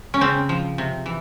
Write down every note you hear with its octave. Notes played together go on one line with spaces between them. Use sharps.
C#4
C#3 C4
F3
C3
E3